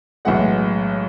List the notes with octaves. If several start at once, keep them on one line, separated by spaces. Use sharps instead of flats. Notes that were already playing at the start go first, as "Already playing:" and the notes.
B1 A2 E3 G#3 F#5